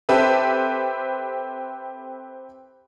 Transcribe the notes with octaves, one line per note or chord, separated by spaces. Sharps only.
C4 G4 A4 B4 E5